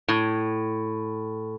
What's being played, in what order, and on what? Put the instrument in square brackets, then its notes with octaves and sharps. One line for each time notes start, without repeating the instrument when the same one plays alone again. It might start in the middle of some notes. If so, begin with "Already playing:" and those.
[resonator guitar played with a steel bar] A2